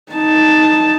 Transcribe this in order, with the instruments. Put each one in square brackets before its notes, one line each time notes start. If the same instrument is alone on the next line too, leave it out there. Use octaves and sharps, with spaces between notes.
[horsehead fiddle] D#4 A5